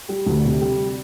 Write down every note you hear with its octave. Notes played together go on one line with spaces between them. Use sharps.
G3
D2
C3
G3